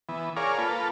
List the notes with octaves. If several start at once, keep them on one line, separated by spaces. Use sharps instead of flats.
E3 B3
G#4 A#4 C#5 D5 F5
A#3 F4 A4 B4